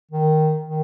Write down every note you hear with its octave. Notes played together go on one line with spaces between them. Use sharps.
D#3
D#3